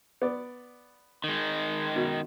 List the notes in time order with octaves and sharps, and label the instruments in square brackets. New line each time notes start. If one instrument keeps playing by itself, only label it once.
[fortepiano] B3 D5
[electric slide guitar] D#3 G#3
[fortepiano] F#2 B2